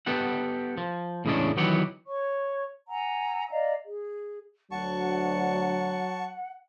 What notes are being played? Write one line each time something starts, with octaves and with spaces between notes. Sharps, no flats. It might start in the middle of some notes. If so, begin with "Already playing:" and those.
B3 G4 A4 F#5
F3
E2 A2 C#3 G#3 C#4 D4
D#3 E3 F#3 B3 G4 F#5
C#5 C#6
F#5 G#5 A#5 E6
D5 D#5 F5 A#5
G#4
D2 F#3 F#5 A5 C#6